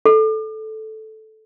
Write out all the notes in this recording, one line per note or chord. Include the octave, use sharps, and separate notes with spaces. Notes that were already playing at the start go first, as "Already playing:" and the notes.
A4